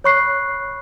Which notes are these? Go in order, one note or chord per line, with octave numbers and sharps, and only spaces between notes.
C#5 B5 C#6 F#6 C7